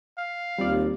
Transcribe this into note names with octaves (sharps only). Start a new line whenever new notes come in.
F5
D#2 G3 C4 F4 D5